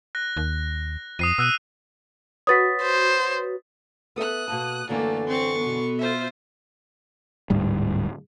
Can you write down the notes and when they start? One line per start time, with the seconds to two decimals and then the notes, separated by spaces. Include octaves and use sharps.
0.15 F#6 A#6
0.37 D#2
1.19 F2 D#6 C7 D#7
1.38 B2 E6 F#6 D#7
2.47 F#4 B4 C#5 D#6 A6 B6
2.82 C5
4.16 B3 A4 E5 D#6 F#6
4.48 B2 A#3 A5
4.89 F#2 D3 E3 A3 A#3 D4 A4
5.28 C4 C6 C#6 A6
5.58 B2 B3
5.99 F4 C5 E5
7.50 D1 G#2 G3